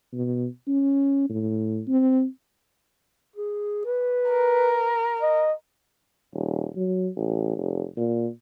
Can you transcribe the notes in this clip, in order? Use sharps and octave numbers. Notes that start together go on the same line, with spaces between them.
B2
C#4
A2
C4
G#4
B4
A#4
D#5
D#1
F#3
A1
F1
A#2